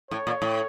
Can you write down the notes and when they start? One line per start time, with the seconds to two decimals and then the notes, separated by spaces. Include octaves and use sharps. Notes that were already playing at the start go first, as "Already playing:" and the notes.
0.11 A2 C#5
0.27 A#2
0.42 A2